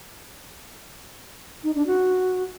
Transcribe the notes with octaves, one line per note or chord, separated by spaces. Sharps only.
D#4
D4
F#4